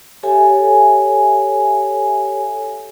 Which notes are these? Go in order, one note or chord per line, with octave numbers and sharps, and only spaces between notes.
G4 A4 C#5 E5 G#5